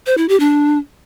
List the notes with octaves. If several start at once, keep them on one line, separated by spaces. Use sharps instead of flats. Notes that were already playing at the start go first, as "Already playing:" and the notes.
C5
E4
G4
D4